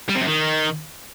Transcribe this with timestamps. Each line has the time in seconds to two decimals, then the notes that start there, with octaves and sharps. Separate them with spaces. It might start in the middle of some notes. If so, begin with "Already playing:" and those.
0.09 G3
0.15 C3
0.21 F#2
0.27 D#3